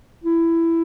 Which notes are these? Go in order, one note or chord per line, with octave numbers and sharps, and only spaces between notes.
E4